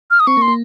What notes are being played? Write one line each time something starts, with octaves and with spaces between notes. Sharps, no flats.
F6
D#6
C4 C#6
A#3
C6
A#3